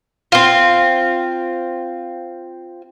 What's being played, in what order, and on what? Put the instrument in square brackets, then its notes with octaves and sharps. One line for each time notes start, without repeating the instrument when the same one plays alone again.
[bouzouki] C4 F4